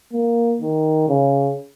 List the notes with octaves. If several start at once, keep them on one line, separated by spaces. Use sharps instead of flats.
A#3
D#3
C#3